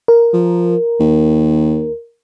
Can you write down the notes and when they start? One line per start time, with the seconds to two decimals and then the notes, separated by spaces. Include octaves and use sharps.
0.08 A#4
0.33 F3
1.00 D#2